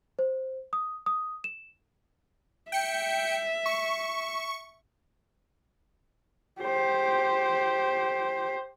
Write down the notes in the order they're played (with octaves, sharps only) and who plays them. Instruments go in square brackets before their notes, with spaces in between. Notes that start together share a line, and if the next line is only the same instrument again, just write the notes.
[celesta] C5
D#6
D#6
E7
[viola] E5 [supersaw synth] G5 C#7
[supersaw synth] C#6
[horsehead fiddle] G4 C5